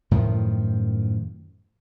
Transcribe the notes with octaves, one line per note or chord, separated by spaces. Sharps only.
F#2 A2 D#3 F3